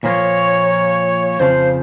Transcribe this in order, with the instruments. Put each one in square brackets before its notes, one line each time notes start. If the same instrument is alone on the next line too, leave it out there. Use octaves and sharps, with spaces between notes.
[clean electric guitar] A#2 F3 A#3 F4 [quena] C#5
[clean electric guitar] F2 C#3 F3 [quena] C5